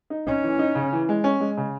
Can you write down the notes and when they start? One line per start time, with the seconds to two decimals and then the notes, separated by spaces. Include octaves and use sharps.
0.10 D#4
0.27 C#4 D#4
0.44 E3
0.59 D#4
0.75 C#3
0.93 E3
1.09 G#3
1.24 C#4
1.40 G#3
1.57 C#3